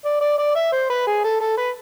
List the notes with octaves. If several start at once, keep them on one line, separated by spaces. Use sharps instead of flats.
D5
D5
D5
E5
C5
B4
G#4
A4
A4
B4